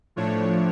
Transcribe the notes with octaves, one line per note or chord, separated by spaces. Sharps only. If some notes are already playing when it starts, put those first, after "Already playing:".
A2 F3 A3 D4 C#5